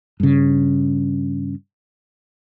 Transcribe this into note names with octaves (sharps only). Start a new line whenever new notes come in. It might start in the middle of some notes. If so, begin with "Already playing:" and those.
G2 C#3